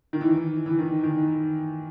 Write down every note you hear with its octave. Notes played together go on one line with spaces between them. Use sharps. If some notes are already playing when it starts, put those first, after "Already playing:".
D#3
E3
E3
D#3
D#3